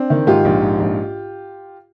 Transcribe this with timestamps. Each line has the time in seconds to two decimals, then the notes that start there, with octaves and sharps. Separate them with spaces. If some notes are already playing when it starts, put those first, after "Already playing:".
Already playing: C4 D4
0.10 D#3
0.27 G#2 F4 G4
0.45 A#1
0.63 G#2
0.80 A#1